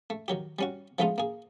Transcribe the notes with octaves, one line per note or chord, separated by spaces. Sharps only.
A3
D#3 F#3 G4
G3 C#4 F#4
F3 G#3 A3 B3 D#4 F4
A#3 G#4